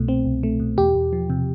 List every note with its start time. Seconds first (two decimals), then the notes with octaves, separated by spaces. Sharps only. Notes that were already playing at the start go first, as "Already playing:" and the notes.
Already playing: C2 B2 A3
0.08 C4
0.25 C2
0.43 A3
0.60 B2
0.78 E2 G4
0.95 E2
1.13 F3
1.30 C3